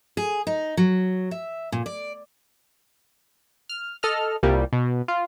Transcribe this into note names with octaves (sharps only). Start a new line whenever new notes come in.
G#4
D#4
F#3
E5
A#2
D5
F6
A4 D#5 F6
C2 A#2 G3 A#3
B2
F4